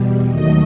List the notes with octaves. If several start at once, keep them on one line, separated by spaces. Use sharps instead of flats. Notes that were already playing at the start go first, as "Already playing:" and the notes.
Already playing: E2 B2 G3
D#2 D#3 F#3 A3 D#5